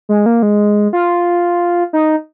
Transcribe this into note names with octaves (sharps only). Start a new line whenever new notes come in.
G#3
A#3
G#3
F4
D#4